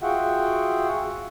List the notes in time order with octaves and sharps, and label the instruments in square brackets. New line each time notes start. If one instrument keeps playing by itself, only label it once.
[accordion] F4 F#4 G#4 E5 F#5 G5